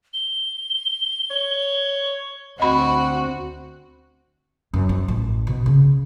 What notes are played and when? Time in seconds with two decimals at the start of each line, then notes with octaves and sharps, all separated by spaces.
0.13 G7
1.31 C#5
2.60 D2 C4 F#4 D#5 B5
4.74 F#2
4.89 F3
5.08 A1
5.47 B2
5.66 C#3